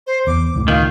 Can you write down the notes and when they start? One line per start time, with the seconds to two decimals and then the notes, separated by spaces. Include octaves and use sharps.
0.07 C5
0.27 E2 D6
0.55 C#2 A2
0.68 D#3 F4